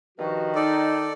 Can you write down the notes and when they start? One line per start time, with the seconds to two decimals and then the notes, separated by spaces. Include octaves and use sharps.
0.18 G2 D#3 F3 F#4
0.55 D#4 A4 D5